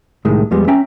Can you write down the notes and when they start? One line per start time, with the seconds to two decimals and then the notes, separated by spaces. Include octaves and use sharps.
0.25 C2 A2 D#3 G#3
0.51 F2 F3 G3 G#3 B3
0.68 C#4 E5 G5 A#5